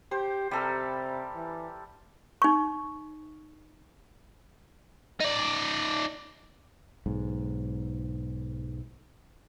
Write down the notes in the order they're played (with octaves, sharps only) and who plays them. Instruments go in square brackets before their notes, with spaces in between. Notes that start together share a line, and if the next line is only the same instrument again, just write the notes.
[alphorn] G4 [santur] C5
[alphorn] C3 [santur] G3 A4 A#4
[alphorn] E3
[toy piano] D#4 C#6
[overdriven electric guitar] D#4 D5
[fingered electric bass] B1 G#2